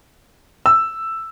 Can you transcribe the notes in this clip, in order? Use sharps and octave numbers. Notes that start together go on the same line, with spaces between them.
E6